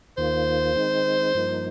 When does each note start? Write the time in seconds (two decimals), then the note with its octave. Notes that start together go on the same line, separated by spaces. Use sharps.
0.18 D#2 D#3 A#3 F4 C5
0.76 D#3 G#3 C4 D#4
1.34 G2 F3 A#3 D#4